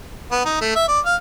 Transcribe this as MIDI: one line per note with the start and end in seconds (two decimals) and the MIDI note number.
0.32 0.45 59
0.46 0.57 63
0.61 0.72 57
0.76 0.85 76
0.88 1.00 74
1.06 1.15 77